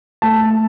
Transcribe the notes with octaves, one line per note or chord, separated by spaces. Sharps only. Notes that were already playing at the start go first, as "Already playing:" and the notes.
A3 A5